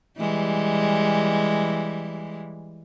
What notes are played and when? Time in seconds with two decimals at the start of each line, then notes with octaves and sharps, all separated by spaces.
0.19 E3 G3 G#3